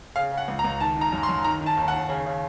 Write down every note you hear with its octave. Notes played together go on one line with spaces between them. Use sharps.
C#3 F5
C#3
F#5
C#2
A#5
C#2
D#3 A5
D#3
A#5
F#2
C6
F#2
D#3 A#5
D#3
A5
D#2
F#5
D#2
C#3
C#3